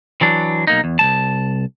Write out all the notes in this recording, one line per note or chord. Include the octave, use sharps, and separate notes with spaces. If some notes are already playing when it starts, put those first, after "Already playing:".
E3 F#3 D4
B1 A#3 D#4
E2
C2 F#3 A5